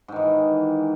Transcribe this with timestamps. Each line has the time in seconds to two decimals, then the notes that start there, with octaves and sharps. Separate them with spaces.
0.08 G#2
0.12 D#3
0.16 E3